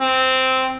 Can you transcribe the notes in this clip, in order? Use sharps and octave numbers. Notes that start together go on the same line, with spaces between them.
C4